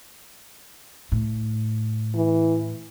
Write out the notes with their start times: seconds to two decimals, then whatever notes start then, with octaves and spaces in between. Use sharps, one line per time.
1.12 A2
2.15 E3